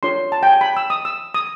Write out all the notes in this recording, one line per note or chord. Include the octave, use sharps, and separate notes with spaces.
D4 F4 A4 C#5 C6
A5
G5
G#5
B5
E6
D#6
E6
D#6